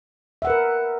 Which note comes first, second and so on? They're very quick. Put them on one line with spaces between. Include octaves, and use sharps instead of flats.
E5 F#5 B4 A#4